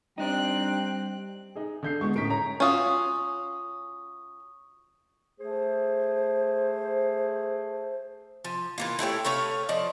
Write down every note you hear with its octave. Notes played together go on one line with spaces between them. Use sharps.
G3 C4 D4 D#4 G5 F#6
D#4 G#4
D3 G6 C7
G#3 B3 F4 C#6
A2 C#4 D#4 A#4 B6 D7
C#5 A#5
C#4 F4 F#4 C#6 D#6
A3 G#4 C5
F3
E3 A#3 F4
A3 E4 G4 C#5
A3 B4 C#5 F5
F3 D5 D#5